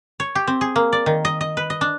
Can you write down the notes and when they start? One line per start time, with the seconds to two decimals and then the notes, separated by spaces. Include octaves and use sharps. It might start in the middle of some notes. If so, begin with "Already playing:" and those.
0.20 C#5
0.35 G4
0.47 C4
0.61 G#4
0.76 A#3
0.93 D5
1.06 D#3
1.25 D#5
1.41 D#5
1.57 B4
1.70 D#5
1.81 D4